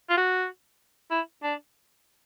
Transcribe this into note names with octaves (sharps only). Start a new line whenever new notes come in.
F4
F#4
E4
D4